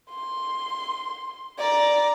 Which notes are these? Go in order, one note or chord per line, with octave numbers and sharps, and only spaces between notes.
C6
D5 A#5